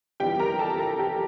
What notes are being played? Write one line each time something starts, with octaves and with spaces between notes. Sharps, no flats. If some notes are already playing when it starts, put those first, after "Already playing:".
G1 F2 E3 G3 G4 G5
A#4 A#5
A4 A5
A#4 A#5
G4 G5